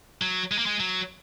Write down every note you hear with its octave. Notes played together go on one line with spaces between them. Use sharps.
F#3
G#3
A#3
G#3
F#3